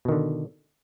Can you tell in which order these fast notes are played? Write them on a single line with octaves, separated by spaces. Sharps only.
B2 D#3 D3